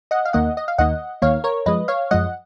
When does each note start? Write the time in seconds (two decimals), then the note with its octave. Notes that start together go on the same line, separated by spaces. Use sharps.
0.11 D#5 F#5
0.25 F5
0.33 D#2 D#3 A#3 D#5 F#5
0.57 D#5
0.68 F5
0.78 D#2 D#3 A#3 D#5 F#5
1.22 D#2 D#3 A#3 C#5 F5
1.44 A#4 C#5
1.66 F#2 F3 G#3 B4 D#5
1.88 C#5 F5
2.11 F#2 F3 G#3 D#5 F#5